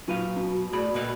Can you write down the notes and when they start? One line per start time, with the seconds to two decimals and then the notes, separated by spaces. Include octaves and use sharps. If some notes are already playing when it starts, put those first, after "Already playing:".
0.08 A#2 F#3 B4 F5
0.36 B2
0.73 A2 G#4 D5 B5
0.94 A#2 A#3 D#4 A4 B4 G5